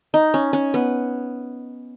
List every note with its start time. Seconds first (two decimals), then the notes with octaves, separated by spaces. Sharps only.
0.14 D#4
0.34 C#4
0.53 C#4
0.74 B3